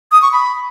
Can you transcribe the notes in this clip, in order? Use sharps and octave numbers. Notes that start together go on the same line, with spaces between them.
D#6
C#6
B5